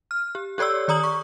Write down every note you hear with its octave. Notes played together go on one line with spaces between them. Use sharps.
F6
G4
G4 A4 C#5 D5 E6
D#3 D5 A#5 D#6 F#7
C#6